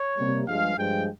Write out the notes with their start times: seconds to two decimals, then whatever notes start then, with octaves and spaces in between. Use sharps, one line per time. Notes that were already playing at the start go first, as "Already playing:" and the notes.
Already playing: C#5
0.17 C3 G3 A#3
0.48 G2 F3 G#3 F5
0.78 G2 F3 G#3 G5